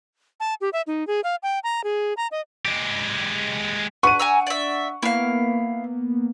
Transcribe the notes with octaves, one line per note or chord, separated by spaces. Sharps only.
A5
G4
E5
D#4
G#4
F5
G5
A#5
G#4
A#5
D#5
G#3 G4
D4 B4 F#5 C#6 D#7
G#5 A#5 E6
D5 E5
A#3 B3 E4 F5